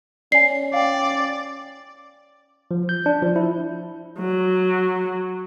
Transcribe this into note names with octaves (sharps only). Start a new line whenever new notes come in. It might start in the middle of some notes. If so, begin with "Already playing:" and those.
C#4 D5 G#5 C7
D5 F5 G5
F3
G6
D4
F3
E4
F#3